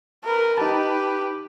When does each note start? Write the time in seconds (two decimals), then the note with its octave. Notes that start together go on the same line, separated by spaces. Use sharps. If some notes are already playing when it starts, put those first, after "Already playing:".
0.24 A#4 B4
0.58 D#4 G4 B4 A5